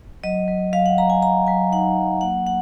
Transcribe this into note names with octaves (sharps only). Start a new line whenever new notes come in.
F#3 D#5
F#3
F#3 F5
F#5
F#3 A#5
G#5
F#3 A#5
F#3 G#5
D#4 F#5
F#3
A#3 F#5
A#3 F#5